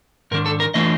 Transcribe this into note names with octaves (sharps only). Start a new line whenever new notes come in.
G#2 D#3 D4 A#4
A4
A#4
E3 A3 D4 F4 D#5